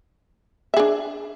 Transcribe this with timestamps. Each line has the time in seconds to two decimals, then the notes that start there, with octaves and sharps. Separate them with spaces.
0.74 E5
0.77 G#4
0.79 D4